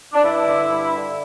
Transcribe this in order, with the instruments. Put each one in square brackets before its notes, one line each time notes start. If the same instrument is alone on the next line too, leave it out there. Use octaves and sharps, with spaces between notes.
[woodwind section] D4
G2 E4
D3
G2
D3